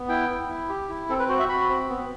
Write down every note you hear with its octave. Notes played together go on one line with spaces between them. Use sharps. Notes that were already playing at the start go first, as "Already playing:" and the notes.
Already playing: B3
E4 G5
E4
E4
G4
E4
C4 A4
B4
F#4 C5
E5
F#4 B5
C4
B3